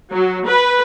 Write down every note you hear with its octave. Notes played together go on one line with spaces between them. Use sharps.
F#3
B4